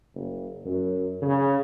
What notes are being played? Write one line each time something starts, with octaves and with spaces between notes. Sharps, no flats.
F#1
F#2
C#3